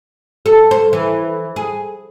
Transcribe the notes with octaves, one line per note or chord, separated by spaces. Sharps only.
A4
C5
E3
G#4